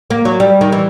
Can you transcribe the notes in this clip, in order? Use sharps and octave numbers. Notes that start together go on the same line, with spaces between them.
A#3
F#3
G3
D#3
E3